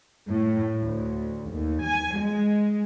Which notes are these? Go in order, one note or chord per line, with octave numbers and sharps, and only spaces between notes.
A2
D2
D#2
G#5
G#3